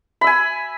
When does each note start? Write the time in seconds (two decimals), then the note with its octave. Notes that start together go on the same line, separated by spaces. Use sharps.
0.21 B5
0.24 E6
0.27 G#5